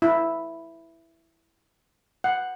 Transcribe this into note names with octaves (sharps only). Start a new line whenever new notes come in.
E4
F#5